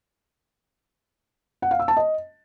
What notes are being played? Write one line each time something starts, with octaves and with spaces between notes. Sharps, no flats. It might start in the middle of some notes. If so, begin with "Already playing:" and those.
F#5
F5
E6
A5
D#5